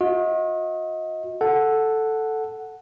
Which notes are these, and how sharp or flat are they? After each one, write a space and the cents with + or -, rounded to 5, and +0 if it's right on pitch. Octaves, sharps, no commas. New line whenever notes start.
F#4 -45 D#5 +25
A4 +0 F#5 +0